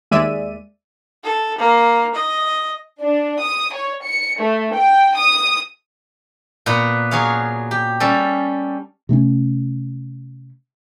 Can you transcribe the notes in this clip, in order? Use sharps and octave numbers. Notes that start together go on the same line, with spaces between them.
D#2 G#3 D5 E5 D#7
A4
A#3
D#5
D4
D#6
C#5
C#7
A3
G5
D#6
A#2 B3 B4 F#5 A#5
F#3 G#4 C#5 F5
G4
G3 C#4 A4
C3 A3 B3 C#4